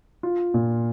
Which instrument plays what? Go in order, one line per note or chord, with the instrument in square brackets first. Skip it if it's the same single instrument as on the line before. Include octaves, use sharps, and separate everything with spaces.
[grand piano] F4
A#2